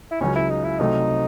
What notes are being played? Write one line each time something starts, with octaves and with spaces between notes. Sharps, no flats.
E4
C#2 C#3 F#3 C#4
E4
D#4
E4
C2 C3 F#3 A3 C4 D#4